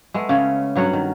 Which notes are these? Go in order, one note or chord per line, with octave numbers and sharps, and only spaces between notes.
G#3 A3 B3
C#3 C#4
G2 F#3 C#4 F#5
D#3